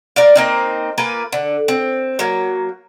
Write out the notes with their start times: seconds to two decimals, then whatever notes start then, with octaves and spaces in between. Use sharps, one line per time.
0.16 A#4 D5 F5
0.36 A#3 C4 D#4
0.98 A#3 F4 B4 G#5
1.33 D3
1.68 C4
2.19 F#3 A#3